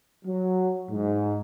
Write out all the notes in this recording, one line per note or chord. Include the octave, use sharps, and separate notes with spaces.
F#3
G#2